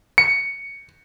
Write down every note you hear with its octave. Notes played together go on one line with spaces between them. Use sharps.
C#7